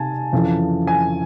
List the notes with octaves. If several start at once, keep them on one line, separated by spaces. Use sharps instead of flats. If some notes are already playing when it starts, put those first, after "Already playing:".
Already playing: C3 D#4 G#5 A5
F2 C#3 E3
G#5